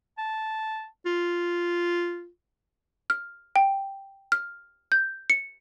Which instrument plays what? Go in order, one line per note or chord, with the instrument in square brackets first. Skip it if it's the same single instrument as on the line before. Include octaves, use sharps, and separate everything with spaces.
[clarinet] A5
F4
[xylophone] F6
G5
F6
G6
C#7